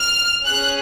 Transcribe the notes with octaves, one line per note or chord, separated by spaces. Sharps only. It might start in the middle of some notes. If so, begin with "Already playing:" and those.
Already playing: F6
C#4 G#4 F#6